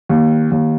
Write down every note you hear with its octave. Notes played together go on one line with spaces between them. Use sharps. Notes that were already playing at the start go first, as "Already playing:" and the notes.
D#2
D#2